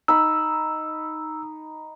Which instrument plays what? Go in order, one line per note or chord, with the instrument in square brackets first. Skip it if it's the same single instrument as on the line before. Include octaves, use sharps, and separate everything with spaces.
[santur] D#4 B5 [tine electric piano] E6